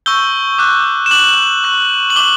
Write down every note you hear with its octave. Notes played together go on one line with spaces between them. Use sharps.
C#6 E6 G6 G7
D6 F#6
E7
D6 F#6 F#7
C#6 F#6
F#7
D6 F#6 G7